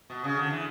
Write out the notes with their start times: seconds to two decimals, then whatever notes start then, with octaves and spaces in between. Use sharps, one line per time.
0.10 B2
0.24 C#3
0.37 D3
0.50 E3